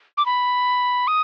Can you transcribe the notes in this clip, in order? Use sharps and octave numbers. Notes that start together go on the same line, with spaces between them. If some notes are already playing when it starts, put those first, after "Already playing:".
D6
B5
D#6